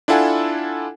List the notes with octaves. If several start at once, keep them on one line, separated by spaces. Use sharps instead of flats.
D4 E4 F4 A4 F#5 G#5